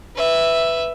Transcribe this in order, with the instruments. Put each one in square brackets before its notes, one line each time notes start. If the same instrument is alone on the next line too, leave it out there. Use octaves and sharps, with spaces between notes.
[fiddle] B4 E5